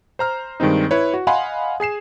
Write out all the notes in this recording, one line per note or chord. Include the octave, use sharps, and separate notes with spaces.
C5 A#5 F6
G2 D#3 G#3 C4 D#4
E4 B4 C#5
F#4
D#5 F5 F#5 G#5 B5 C6
G#4 G#5 C7 E7